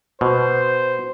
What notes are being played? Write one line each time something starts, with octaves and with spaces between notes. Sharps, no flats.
B2 C5